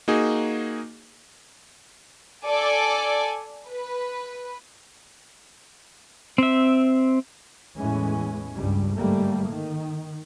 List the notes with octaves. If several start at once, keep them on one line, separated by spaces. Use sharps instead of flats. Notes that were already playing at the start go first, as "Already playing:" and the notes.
A#3 D#4 F#4 G#4
A4 D5 G#5 D6
B4
C4 E5
E2 A2 E3 G#3 C#4
C#2 G2 G3
G1 G#2 G3 A3 A#3
D#3